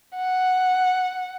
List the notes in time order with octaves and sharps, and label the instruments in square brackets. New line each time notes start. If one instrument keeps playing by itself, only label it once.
[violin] F#5